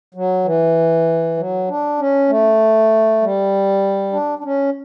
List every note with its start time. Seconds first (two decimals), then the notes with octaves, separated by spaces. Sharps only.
0.14 F#3
0.45 E3
1.37 F#3
1.68 D4
1.99 C#4
2.29 A3
3.21 G3
4.12 D4
4.39 D4
4.44 C#4